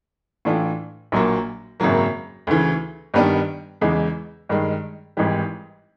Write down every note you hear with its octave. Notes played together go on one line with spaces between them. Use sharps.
A2 E3 A3 D4 F4
A#1 A#2 F#3 A#3
G#1 F#2 C#3 F#3 A#3
D2 C#3 E3
G2 D#3 G3 B3 D4
E2 C#3 E3 G#3
G2 D#3 G#3
G#1 G#2 E3 G3